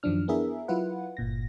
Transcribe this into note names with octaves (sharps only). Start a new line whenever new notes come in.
F#2 D#3 F3 F#3 D4 F6
B3 D4 E4 G#4 A#4 E5
F#3 E4 F4 B4 F#5
G1 A#2 A#6